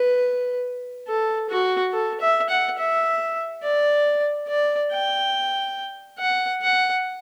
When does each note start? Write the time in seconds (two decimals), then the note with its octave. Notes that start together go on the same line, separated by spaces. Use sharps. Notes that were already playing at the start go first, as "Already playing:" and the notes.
Already playing: B4
1.08 A4
1.50 F#4
1.93 A4
2.21 E5
2.49 F#5
2.79 E5
3.63 D5
4.48 D5
4.92 G5
6.19 F#5
6.62 F#5